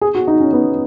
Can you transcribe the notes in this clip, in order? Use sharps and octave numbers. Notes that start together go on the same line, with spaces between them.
G#4
F#4
D#4
C#4
B3